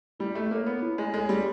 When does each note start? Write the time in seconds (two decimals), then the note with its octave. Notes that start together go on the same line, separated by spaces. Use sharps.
0.20 G3 E4
0.35 A3
0.51 A#3 A4 C#5
0.66 B3
0.82 E4
0.98 G#3
1.14 G#3 A4 C#5
1.29 G3